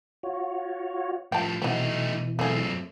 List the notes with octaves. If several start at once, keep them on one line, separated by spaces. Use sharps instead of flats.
F4 F#4 C#5
A2 F3 G5 A5
B2 E3 F#3 A3 C4 D#4
F#2 A3 C4 G#4